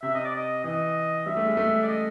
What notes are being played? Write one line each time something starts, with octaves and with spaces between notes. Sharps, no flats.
C3 E5
D#5
D5
D#5
E3 D#5
G3 E5
A3
G#3
A3
D5
D#5